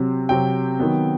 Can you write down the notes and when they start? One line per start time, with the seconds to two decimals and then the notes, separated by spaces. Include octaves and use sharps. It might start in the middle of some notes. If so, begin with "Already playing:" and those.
Already playing: C3 F#3 C4
0.29 C3 F#3 C4 G5
0.79 D#3 F#3 B3